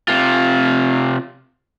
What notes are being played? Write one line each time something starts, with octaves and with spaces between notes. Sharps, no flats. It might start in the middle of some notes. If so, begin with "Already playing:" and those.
C3 F4